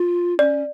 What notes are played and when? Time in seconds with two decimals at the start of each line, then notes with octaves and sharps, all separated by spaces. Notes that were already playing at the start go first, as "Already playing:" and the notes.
Already playing: F4
0.39 C#4 D5